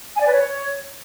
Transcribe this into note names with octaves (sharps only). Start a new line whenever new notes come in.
G#5
D5
B4
C#5